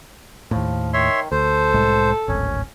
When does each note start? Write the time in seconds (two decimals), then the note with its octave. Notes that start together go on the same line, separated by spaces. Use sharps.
0.51 D#2 A2 F3
0.93 D#3 C#5 E5 C6
1.32 D2 A4 C5
1.74 C2 A2 G#3
2.28 D1 G#1 C#4